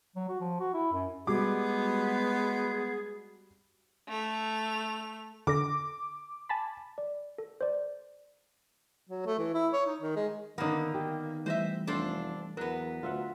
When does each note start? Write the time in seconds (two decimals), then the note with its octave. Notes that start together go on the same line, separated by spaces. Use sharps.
0.16 F#3
0.29 F#4
0.40 F3
0.60 F#4
0.74 E4
0.93 F#2
1.27 G3 G#3 B3 F#4 G#4 D6
4.08 A3 F7
5.47 D3 A4 D6 A#6
6.49 G#5 A5 B5
6.98 D5
7.38 A4
7.61 C5 D5
9.10 F#3
9.26 A3
9.39 E3
9.54 E4
9.73 C#5
9.86 D#4
10.02 D#3
10.16 G#3
10.58 D3 D#3 A#3 B3 D#4
10.94 D#3 G4
11.46 E3 G3 A3 C5 D#5 E5
11.87 F1 D4 A4 C5
12.57 E2 F#3 B3 A#4
13.03 D2 F4 E5 F#5